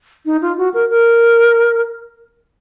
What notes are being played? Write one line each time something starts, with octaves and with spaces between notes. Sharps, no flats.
D#4
F4
F#4
A#4
A#4